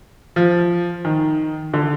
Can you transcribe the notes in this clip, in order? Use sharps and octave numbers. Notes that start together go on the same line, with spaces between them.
F3
D#3
D3